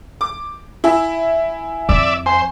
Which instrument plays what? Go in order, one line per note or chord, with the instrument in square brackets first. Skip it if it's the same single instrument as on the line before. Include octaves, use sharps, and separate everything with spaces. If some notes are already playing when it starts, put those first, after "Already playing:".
[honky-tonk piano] D6
[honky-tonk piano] E4 [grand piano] E5 G#5 E6
[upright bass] F2 [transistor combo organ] D5 E5
[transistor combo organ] C5 [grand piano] G#5